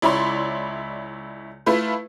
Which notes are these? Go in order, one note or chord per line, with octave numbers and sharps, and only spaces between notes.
C#2 E4 C#5 D5 B5 C6
A3 E4 F4 B4